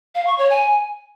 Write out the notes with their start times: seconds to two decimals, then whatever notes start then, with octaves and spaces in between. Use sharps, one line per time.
0.15 F5
0.27 C#6
0.38 C#5
0.50 G#5